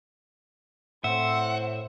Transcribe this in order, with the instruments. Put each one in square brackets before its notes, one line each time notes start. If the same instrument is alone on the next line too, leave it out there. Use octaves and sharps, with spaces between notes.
[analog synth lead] A2 [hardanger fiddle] C4 C5 [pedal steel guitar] E5 [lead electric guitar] F#5